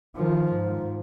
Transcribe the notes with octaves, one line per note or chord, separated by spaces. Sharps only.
D#3 F3
G#2